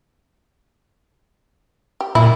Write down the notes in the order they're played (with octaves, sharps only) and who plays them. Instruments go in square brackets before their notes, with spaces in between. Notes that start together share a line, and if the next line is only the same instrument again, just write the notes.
[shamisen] G4
[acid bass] A#2 [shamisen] E4